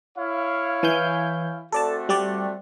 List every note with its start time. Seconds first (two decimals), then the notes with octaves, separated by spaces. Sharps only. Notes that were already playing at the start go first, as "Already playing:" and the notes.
0.19 E4 C#5 F5
0.83 E3 G#5 G6
1.72 A3 C4 F#4 A4 D5 A5
2.09 G3 G4 D5